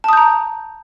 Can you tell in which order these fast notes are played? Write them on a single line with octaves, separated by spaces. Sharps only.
A5 D#6 G6 A#5